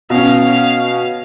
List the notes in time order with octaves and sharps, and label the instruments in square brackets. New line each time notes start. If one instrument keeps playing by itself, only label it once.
[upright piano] B2 C#4 [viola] F5